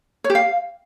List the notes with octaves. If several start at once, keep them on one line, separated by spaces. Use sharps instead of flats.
C#5
G4
F5